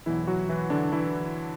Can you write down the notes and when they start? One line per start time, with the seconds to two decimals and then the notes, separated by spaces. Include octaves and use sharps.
0.06 E2 B2 E3 F#3 E4
0.27 F#3 F#4
0.49 E3 E4
0.70 D3 D4
0.92 E3 E4